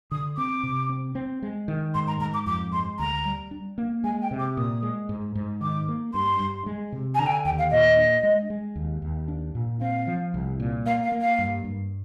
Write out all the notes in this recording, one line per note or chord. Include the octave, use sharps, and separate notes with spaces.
D3 D#6
C4 D6
C3
C4
C4
G#3
D#3
G#2 C6
A#5
G#2 A#5
D6
F2 D6
G#3 C6
D2 A#5
G3
D4
A#3
G#3 G#5
G5
C3
D6
A#2 D#6
G#3
G#2
G#2
D#3 D6
A#3
G2 C6
G2
G#3
C3
G#5
D3 A#5
G5
G#5
D#2 G5
F5
A#2 D#5
D4
G#3
G#3
D#2
D#2
D4
A#2
C4 F5
F3
C2
A#2
A#3 F5
F5
A#3
F5
G2
G2